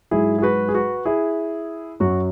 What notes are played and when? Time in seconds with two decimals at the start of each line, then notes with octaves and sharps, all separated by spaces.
0.11 G#2 F#3 E4 G#4
0.39 G#4
0.42 F#4 B4
0.69 G#4
0.74 F#4 B4
1.05 E4 G#4
2.00 F#2 F#3 F#4